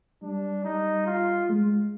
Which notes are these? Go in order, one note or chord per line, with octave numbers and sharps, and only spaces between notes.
G3 D4
G3 D#4
F4
G#3